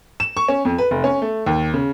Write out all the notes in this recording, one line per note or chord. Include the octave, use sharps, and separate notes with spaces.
E7
C#6
C#4
F2
B4
F1
C#4
A3
D#2
C#3